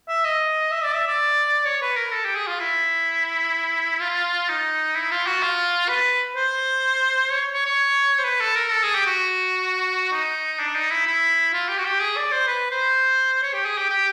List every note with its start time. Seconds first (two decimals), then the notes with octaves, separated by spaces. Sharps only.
0.08 E5
0.24 D#5
0.71 E5
0.83 D5
0.94 E5
1.07 D5
1.65 C#5
1.82 B4
1.96 A#4
2.12 A4
2.25 G4
2.35 G#4
2.47 F4
2.60 E4
4.01 F4
4.48 D#4
4.95 E4
5.11 F4
5.26 F#4
5.42 F4
5.88 B4
6.36 C5
7.31 C#5
7.53 C#5
7.66 C#5
8.18 C5
8.24 B4
8.40 A4
8.55 A#4
8.71 A4
8.83 G#4
8.95 G4
9.06 F#4
10.12 D#4
10.60 D4
10.75 D#4
10.91 E4
11.06 E4
11.53 F4
11.69 G4
11.78 F#4
11.85 G4
12.01 G#4
12.17 D5
12.32 C5
12.47 B4
12.71 C5
13.42 C#5
13.53 G4
13.65 G#4
13.78 G4
13.89 G4